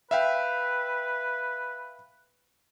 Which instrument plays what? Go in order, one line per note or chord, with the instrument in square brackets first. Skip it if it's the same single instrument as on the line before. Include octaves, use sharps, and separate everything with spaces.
[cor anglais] B4 [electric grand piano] E5 F5 G5